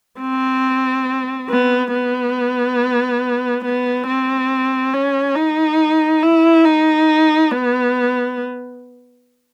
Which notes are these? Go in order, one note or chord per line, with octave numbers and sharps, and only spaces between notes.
C4
B3
B3
B3
C4
C#4
D#4
E4
D#4
B3